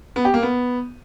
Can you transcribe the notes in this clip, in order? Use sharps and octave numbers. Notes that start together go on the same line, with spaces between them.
B3
G4
A#3
B3